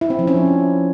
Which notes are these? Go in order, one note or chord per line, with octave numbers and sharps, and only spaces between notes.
E4
C4
F3
C#4
D4